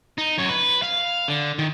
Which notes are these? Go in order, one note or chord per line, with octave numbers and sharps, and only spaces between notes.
D#4
F#2 C#5
B4
F5
D3
D#3